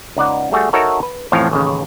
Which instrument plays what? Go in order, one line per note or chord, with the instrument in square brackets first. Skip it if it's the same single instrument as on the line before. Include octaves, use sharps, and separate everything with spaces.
[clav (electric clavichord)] C#2 D#4 D5 F#5
G3 A3 F#4 G#4
D#4 F#4 A4 A#4 C#5 E5
B4
A1 F2 A2 F3 F5
A1 D#2 C#3